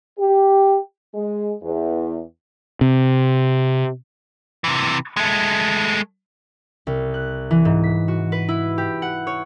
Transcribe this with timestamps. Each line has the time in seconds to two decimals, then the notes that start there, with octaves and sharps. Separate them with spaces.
0.19 G4
1.14 G#3
1.63 E2
2.81 C3
4.64 C3 E3
5.17 G#3 A3
6.87 C2
7.14 F#6
7.51 E3
7.65 G#2
7.83 B6
8.08 F#4
8.32 B4
8.49 E4
8.78 G4
9.02 F#5
9.27 C#5